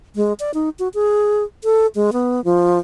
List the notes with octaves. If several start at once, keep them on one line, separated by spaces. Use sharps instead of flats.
G#3
D5
D#4
F#4
G#4
A4
G#3
B3
F3